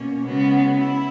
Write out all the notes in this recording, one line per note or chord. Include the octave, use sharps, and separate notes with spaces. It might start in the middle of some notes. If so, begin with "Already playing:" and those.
Already playing: B2 A#3 C#4
C#3 G#3 B3 F#4
E4